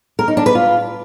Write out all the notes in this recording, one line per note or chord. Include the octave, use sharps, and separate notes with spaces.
A#4
D#4
D4
B4
F4